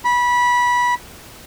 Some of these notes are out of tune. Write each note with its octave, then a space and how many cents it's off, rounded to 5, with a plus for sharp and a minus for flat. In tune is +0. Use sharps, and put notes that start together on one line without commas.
B5 -20